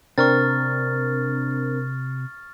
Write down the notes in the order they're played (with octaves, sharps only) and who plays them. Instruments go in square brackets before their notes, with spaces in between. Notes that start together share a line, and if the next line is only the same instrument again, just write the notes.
[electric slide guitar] C3 [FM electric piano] C4 D4 A#4 [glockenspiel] C#6 F6 A6